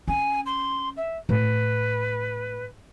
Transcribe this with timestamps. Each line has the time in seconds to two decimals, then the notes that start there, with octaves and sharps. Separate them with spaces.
0.08 C#4 G#5
0.46 C6
0.96 E5
1.29 A2 B4